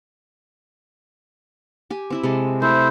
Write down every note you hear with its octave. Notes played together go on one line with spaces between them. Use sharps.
G4 G#5
C4 E4 E5
C3 G#3 A4
A3 E4 C5